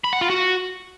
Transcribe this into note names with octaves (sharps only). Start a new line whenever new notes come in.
B5
F#5
F4
F#4